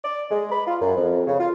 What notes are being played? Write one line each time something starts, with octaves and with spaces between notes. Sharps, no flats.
D5
G#3
B5
F4
F#2
F2
C#3
F4